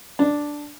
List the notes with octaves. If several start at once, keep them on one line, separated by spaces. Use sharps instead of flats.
D4